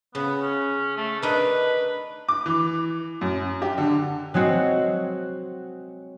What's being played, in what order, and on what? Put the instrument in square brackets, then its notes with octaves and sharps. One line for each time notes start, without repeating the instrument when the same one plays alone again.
[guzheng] C#3 [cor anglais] B3
[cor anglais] C#4
A3
[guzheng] D4 D#4 A#4 [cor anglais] B4
[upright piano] D6
E3
F#2
G4
D3
[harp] F#3 G#3 C4 F#4